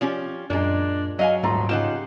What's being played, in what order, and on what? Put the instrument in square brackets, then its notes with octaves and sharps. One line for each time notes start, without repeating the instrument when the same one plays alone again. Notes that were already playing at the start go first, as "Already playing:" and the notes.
[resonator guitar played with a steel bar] F3 C#4 G4
[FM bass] F#2 [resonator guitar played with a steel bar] A#2 G#3 [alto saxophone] D4
[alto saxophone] F#3 [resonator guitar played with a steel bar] D#5 F5 G#5
[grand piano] D#1 A#5 C6 [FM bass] G#2 [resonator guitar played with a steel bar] A3
[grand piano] C#3 D#4 E7 [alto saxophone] F4 [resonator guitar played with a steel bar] G4 C5 F#5